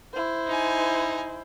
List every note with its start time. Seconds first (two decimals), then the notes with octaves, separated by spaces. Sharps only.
0.13 E4 C5
0.47 D#4 G#5